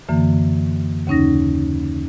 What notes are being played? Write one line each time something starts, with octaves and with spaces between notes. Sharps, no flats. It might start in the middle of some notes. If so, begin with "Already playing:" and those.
F#2 D3 E3 A#3
D#2 C#3 C#4 D#4 A#6